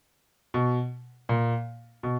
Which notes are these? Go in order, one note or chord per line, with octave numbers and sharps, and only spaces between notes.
B2
A#2
B2